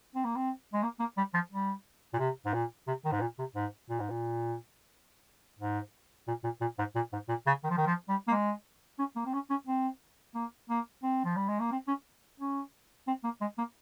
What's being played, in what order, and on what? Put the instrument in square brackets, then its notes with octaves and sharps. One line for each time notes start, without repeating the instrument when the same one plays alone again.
[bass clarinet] C4
A#3
C4
G#3
A#3
A#3
G3
F3
G3
A#2
C3
G#2
A#2
C3
D#3
G#2
A#2
C3
G#2
A#2
G#2
A#2
G#2
A#2
A#2
A#2
G#2
A#2
G#2
A#2
C#3
D#3
F3
D#3
F3
G3
A#3
G#3
C#4
A#3
C4
C#4
C#4
C4
A#3
A#3
C4
F3
G3
G#3
A#3
C4
C#4
C#4
C4
A#3
G#3
A#3